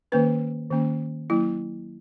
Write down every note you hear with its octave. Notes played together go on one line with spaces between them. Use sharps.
D#3 A#3 C#4 B4
D#3 A#3 C#4
F#3 A#3 C#4 E4